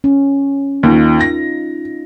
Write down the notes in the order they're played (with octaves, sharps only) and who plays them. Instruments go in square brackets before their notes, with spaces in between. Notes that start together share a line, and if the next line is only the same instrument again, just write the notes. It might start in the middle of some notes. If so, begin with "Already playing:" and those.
[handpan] C#4
[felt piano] D#2 [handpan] C#4 D#4 F4
[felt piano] A#6